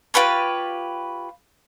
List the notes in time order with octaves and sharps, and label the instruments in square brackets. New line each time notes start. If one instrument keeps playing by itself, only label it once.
[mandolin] F4 G4 B4 C#5